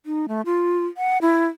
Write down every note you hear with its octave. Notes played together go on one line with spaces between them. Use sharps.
D#4
A3
F4
F#5
E4